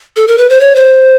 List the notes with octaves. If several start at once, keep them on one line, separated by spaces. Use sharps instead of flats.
A4
A#4
B4
C5
C#5
C5